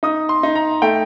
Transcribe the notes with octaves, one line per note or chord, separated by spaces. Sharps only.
D#4 D#6
C6
D#4
A#5
A3 G5